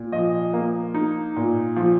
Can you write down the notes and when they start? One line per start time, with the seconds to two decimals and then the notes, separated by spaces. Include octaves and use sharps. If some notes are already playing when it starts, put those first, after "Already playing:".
Already playing: A#2
0.12 F3 D#5
0.54 A#3
0.94 D#4
1.36 A#2
1.76 F3